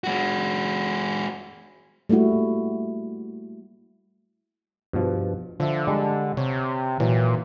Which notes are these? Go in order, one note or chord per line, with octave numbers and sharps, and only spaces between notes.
G#3 F#4
G3 A3 A#3 E4 F#4
G2 B2 F3
D3 F3 E5
G3 G#3 D4
C3 C#5
A#2 E3 F#3